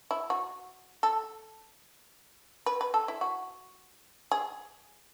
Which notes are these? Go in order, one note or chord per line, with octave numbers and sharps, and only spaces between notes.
E4
F#4
A4
B4
B4
A4
E4
F#4
G#4